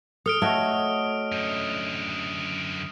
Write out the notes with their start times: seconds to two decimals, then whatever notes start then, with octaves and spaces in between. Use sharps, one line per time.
0.26 A4 D#6 F6 D7
0.42 A3 F#4 C#5 D#5 E5
1.32 F#2 D3